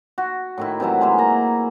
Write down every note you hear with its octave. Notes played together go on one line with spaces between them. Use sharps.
F#4
A2 D#3 E4
C3 E3 F#3 E4
G#3 A#3 E4
A#3 A#5